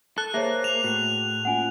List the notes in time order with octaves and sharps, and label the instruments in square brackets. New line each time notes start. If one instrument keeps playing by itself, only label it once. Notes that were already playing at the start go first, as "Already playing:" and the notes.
[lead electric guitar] A4 [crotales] F#6
[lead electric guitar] A#3 [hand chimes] G#4 C5 [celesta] C#5 E5
[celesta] E7 [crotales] F7
[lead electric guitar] A2 [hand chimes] F#4
[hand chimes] A#3 C#4 F4 [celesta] F#5 G#5